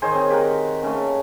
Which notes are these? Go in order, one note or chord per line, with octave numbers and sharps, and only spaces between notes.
D#3 G#4 C5 C#5
C4 G#4
G4 A#4 F#5
C#3 A3